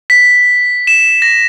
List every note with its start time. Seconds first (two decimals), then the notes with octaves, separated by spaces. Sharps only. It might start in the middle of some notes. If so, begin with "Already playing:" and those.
0.10 B6
0.87 E7
1.22 A#6